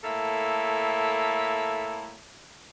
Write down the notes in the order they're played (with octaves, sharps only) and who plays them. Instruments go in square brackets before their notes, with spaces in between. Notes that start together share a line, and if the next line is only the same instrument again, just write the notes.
[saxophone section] A2 A#3 A4 E5